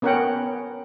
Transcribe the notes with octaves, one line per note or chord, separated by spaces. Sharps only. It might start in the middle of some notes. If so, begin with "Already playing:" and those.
B3 C#4 A#4 C#5 F#5 G5